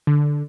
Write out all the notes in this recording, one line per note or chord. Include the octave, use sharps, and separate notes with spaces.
D3